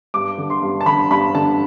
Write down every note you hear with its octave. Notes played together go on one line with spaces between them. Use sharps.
G2 D6
D3
C6
G2
A5
D3 B5
G2 B5
D3 A5